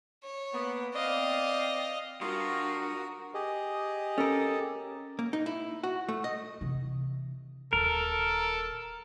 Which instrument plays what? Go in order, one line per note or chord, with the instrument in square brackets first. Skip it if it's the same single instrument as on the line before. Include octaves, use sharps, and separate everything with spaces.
[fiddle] C#5
[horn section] A#3 B3
[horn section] C4 D5 [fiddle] D#5 F5
[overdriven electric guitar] G2 [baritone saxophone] F4 [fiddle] F#4 A#4 [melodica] A#5 C#6 D#6
[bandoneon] G4 G#4 D#5
[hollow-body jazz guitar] C#4 A#4 [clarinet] A4
[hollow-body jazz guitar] A#3
D#4
E4
F#4
A3
D#5
[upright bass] C3 E3
[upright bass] D#1 [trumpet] A4 [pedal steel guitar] A#4